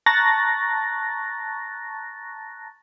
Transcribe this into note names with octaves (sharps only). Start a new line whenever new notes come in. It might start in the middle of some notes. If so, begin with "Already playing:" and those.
A5 A#5 C#6 F#6 A6 A#6